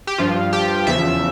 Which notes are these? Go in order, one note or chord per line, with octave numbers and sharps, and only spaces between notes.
G4
G2 F3 F4
G4
E2 C#3 F3 E5